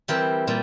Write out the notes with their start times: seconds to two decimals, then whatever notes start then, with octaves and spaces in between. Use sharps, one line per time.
0.08 E3 G3 C4 G4 A#4
0.47 A#2 G3